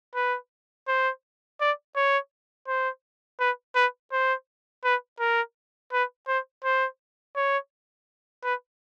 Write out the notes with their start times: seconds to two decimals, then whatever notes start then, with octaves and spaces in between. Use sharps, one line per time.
0.15 B4
0.88 C5
1.60 D5
1.96 C#5
2.68 C5
3.40 B4
3.75 B4
4.12 C5
4.84 B4
5.20 A#4
5.93 B4
6.28 C5
6.64 C5
7.36 C#5
8.44 B4